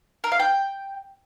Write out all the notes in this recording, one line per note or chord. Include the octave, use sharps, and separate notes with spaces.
A#4
F5
G5